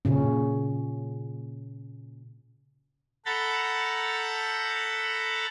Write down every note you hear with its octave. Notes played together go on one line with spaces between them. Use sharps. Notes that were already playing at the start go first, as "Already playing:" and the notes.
A#2 C#3 C#4
A4 F#5 A#5 B5 G6 A6